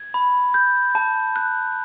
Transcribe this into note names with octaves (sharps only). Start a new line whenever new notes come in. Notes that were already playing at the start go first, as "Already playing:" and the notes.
Already playing: G#6
B5
G6
A5
F#6